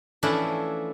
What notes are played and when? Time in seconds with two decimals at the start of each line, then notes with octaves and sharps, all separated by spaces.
0.23 E3 F3 A3 C#4 D4 E4